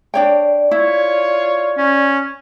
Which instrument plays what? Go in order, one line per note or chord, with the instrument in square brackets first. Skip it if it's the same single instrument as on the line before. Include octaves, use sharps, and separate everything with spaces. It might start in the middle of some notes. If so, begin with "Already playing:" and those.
[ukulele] D4 C#5 G5 [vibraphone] D5
[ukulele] E4 [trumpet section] F4 C#5
[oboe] C#4